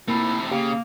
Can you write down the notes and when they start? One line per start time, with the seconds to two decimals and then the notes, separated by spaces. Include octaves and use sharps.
0.08 C3 A3 A#3 E4
0.51 C#3 A#3 G4